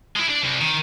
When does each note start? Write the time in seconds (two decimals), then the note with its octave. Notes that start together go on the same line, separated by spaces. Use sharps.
0.16 G#3 E4
0.29 D4 D5
0.43 C2
0.61 D#3